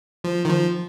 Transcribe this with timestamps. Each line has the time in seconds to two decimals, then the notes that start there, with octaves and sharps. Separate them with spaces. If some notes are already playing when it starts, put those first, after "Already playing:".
0.24 F3
0.45 D#3
0.49 F3